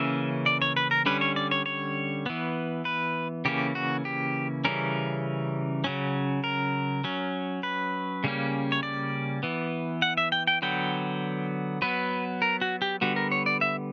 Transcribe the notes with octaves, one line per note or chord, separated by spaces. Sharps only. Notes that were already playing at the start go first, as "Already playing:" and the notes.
Already playing: C#3 E3 A#3 C#4 E5
D5
C#5
B4
A#4
D3 G3 C#4 B4
C#5
D5
C#5
C#5
E3 B3
B4
C#3 E3 A#3 C#4 G4
F#4
G4
C#3 E3 G3 C#4 A#4
C#3 F#3 C#4
A#4
F#3 C#4
B4
C#3 G3 A#3 C#4
C#5
D5
E3 B3
F#5
E5
G5
G5
D3 F#3 B3 G5
F#3 B3 B4
A#4
F#4
G4
D3 G3 B3 F#4
A#4
C#5
D5
E5